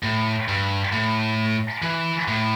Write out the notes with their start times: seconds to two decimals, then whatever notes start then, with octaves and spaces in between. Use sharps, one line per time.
0.03 A2
0.48 G2
0.92 A2
1.82 E3
2.28 A2